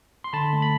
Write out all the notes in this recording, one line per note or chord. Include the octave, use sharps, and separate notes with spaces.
C6
D3 A5 B5
A3
B5